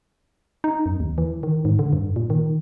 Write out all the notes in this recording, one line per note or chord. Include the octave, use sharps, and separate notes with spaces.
D#4
F#2
D#2
E3
D#3
G#2
D3
G2
A#2
D#3